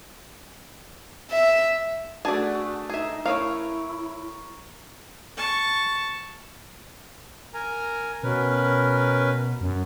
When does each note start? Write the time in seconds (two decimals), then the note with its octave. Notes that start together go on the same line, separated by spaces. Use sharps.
1.31 E5
2.25 A3 D4 F#4 G#4 D5 A5
2.89 D#4 G#4 E5
3.26 A3 C#4 E4 A#4 C#5 F5
5.37 A5 C#6
7.54 A#4 G#5 A#5
8.23 B2 C#4 A#4 B4
9.61 F#2